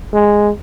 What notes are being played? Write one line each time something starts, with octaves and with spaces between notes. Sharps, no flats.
G#3